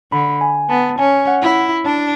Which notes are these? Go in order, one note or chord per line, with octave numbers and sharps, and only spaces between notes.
D3 B5
G#5
B3 A5
C#4 G#5
F#5
E4
D4 A5